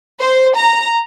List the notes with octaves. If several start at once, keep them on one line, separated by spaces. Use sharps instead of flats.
C5
A#5